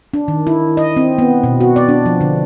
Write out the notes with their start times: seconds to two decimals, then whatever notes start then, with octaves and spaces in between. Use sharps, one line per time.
0.14 D4
0.28 D#3
0.47 E4
0.77 D#5
0.97 C4
1.18 B3
1.44 B2
1.60 F#4
1.76 D5
1.89 D4
2.06 F3
2.21 D3